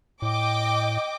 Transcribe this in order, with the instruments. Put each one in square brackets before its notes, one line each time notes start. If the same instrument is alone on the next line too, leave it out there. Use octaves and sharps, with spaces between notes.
[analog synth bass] A2 [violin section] D#5 G5 D6